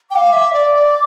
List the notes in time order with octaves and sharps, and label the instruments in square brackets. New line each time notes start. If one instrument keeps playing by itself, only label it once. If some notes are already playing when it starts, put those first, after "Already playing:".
[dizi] G5 [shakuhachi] D6
[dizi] F5
E5
D5
D5